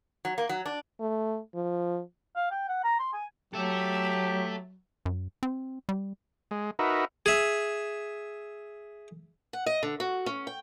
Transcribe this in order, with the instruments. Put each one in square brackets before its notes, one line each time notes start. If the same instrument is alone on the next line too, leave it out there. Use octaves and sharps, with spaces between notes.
[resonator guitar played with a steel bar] F#3
A#3
F#3
D4
[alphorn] A3
F3
[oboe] F5
G5
F#5
A#5
C6
G#5
[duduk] F#3 [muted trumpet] G4 [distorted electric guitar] A4 E5
[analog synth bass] F#2
C4
G3
[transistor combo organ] G#3
D#4 F#4 A#4 B4 E5
[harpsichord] G#4 E5
[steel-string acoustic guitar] F#5
D#5
D3
F#4
C#4
G5